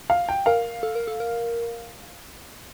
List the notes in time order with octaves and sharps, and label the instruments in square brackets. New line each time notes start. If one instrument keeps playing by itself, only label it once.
[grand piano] F5
G5
[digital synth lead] A#4 [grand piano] F5
[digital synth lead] A4
A#4
A4
A#4